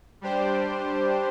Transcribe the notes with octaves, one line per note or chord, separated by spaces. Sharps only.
G3 D4 G4 C5